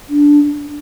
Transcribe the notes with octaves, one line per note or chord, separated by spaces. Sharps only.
D4